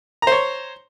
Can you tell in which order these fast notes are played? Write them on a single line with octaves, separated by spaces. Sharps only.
A#5 C5 C#5